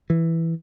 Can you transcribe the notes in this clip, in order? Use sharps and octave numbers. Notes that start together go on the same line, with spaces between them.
E3